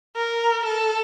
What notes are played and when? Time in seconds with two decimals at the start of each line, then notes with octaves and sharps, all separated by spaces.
0.16 A#4
0.65 A4